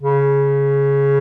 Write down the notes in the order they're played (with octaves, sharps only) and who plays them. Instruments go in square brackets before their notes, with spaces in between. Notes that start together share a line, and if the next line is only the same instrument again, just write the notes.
[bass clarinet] C#3